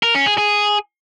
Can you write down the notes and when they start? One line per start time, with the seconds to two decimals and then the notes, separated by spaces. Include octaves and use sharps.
0.03 A#4
0.15 C#4
0.26 G#4
0.38 G#4